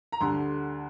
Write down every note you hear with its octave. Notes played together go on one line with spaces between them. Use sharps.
A#5
D2 D3 G3 C6